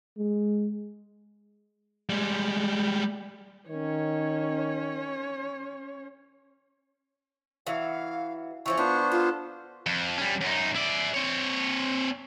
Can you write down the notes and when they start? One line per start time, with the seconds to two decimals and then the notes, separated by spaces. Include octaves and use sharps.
0.18 G#3
2.10 G3 G#3
3.69 D#3 C#4 C#5
7.67 E3 F#3 F5
8.66 E3 F3 C#4 C#6
8.78 B3 D4 F4 C5
9.12 F4 A4
9.87 F2
10.18 G3 C#4
10.41 F#2 D#4
10.75 E4 D5
11.14 C4 C#5